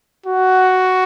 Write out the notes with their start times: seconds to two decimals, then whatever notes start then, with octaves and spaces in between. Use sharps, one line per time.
0.26 F#4